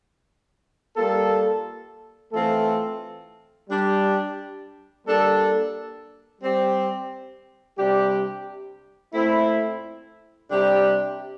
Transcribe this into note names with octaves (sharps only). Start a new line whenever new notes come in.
G3 A#3 F4 A4
E3 A3 C4 F4 A4
G3 D4 G4
G3 A#3 D4 A4
G3 C4 G4
C3 G3 D4 G4
A#2 A3 C4 E4
C3 G3 D4 G4